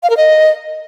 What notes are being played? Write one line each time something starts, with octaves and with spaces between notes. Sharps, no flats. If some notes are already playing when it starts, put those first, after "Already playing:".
F5
A#4
D#5